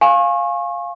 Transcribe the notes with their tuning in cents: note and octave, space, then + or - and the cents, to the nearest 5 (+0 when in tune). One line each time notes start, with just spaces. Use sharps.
F5 +0 G#5 +0 C#6 -35